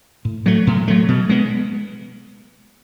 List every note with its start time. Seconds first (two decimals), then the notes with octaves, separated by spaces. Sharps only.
0.25 A2
0.46 F#3 A3
0.67 A2
0.88 F#3 A3
1.08 B2
1.29 G#3 B3